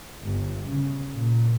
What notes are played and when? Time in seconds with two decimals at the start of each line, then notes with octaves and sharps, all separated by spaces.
0.22 G1
0.67 C#3
1.12 A#2